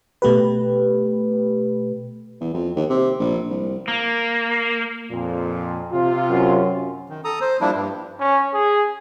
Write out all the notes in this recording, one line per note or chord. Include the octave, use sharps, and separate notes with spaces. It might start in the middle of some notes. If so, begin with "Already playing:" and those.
B2 A3 G4 B4
E2
F2
D#2
C3
A#1
C2
A#3
F2 A#2
C3 F4
F#2
D#3
A4 A#5 D#6
C5
F3 G3 A#3 D4 E4
G2
C#4
G#4